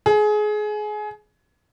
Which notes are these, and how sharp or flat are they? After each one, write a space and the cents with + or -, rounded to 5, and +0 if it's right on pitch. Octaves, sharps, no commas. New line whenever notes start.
G#4 +25